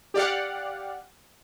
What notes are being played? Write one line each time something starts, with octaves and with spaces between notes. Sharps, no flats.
G4 D5 F5 F#5